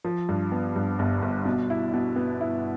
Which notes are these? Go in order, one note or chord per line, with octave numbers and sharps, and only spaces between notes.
F3
G2
B3
G2
G1
G1
B2
E4
B2
B3
E4